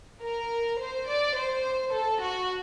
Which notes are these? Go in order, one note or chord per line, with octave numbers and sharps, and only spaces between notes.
A#4
C5
D5
C5
A4
F#4